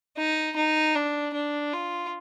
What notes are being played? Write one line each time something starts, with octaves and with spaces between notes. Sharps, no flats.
D#4
D#4
D4
D4
F4